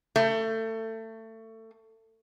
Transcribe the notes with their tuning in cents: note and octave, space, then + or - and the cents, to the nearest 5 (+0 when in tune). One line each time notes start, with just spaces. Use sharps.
A3 +25